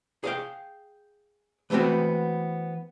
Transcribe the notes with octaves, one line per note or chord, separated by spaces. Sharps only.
G#4 F5 G5
E3 A3 B3 C4 F#4